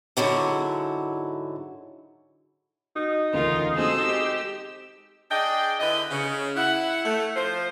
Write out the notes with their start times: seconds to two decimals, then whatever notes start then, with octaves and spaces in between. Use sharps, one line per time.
0.17 G#2 D3 F#3 E4
2.96 D#4 F#4
3.33 E1 D2 C#3 F4 A#4
3.76 G#3 C4 F#4 G#4 A4 C5 D#5 E6
4.07 G4
5.31 D4 G#4 D5 D#5 G5
5.80 D3 E4 B4 D#5
6.11 C#3
6.56 E4 F#5
7.05 A3
7.36 F3 C5